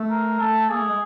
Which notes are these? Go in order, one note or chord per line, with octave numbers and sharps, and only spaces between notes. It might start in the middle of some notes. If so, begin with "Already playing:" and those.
Already playing: A3
A#4
A3 A4
A#3 G#4
A3
G#3